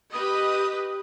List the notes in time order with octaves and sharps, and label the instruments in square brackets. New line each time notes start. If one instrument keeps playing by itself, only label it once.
[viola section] G4 B4 D#5 [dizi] D#6